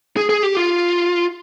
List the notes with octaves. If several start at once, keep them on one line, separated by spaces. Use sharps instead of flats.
G#4
G#4
G4
F4